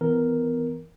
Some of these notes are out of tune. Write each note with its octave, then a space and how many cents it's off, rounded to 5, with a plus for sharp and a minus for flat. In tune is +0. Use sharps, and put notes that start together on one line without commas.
E3 +0 B3 +25 A#4 +0